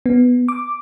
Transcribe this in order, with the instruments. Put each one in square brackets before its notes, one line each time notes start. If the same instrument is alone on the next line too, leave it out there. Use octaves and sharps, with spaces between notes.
[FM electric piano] B3
D6